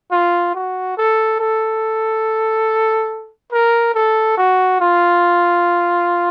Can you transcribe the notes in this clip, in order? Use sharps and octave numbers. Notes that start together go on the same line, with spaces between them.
F4
F#4
A4
A4
A#4
A4
F#4
F4